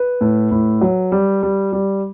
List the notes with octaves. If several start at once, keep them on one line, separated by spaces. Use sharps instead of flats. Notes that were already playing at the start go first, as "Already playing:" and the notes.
Already playing: B4
A2
A2
F#3
G3
G3
G3